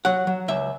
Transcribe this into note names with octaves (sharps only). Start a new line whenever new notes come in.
F#3 F#5
F#3
C#2 E5